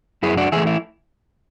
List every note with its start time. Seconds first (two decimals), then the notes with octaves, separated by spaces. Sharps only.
0.23 F#2 E4 G#4
0.37 D4 F#4
0.52 E3 A3 E4 G#4
0.67 E4